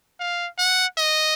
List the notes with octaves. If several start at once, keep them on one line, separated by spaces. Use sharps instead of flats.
F5
F#5
D#5